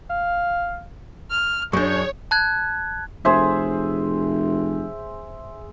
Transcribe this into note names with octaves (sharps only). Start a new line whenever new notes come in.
F5
F6
F#2 D4 G#4 C#5 C#6 G6
A5 F#6 G#6
F1 G#4 C5 E5